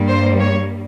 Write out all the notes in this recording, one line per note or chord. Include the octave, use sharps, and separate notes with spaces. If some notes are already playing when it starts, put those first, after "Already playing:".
Already playing: G2 G3 A#3
C5
C#5